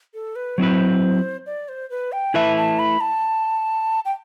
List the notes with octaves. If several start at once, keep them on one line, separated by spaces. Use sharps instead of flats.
A4
B4
F#3 C4 E4 B4 C5
D5
C5
B4
G5
A3 E4 B4 E5 A5
A5
B5
A5
G5